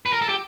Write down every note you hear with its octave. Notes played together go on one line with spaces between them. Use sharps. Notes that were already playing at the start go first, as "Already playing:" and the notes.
B4
A#4
A4
G4